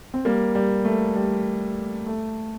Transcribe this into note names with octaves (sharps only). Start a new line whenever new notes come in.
C4
G3 A#3
G3
A3
G3
A3